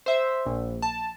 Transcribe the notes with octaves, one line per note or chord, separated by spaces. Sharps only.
C5 E5
A#1
A5